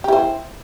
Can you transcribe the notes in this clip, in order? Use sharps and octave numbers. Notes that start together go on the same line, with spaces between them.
E4 G4 C5